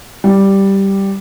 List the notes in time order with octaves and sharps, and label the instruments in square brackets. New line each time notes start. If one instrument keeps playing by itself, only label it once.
[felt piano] G3